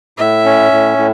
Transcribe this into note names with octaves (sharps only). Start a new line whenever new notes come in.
A2 E5
C#4
A2
A2